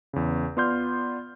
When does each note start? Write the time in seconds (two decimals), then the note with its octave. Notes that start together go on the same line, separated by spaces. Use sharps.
0.13 E2 C#3
0.57 B3 F4 D5 C6 F6 G6